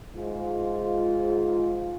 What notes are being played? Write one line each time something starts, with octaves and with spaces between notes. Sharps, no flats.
G#2 F4